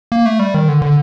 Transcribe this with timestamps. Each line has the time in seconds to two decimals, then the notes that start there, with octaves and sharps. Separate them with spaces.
0.12 A#3
0.26 A3
0.39 G3
0.54 D#3
0.69 D3
0.82 D3